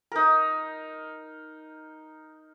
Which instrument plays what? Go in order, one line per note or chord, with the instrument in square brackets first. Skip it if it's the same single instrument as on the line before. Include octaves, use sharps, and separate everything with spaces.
[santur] D#4 A#4